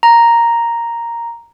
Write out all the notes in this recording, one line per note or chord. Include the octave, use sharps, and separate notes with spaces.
A#5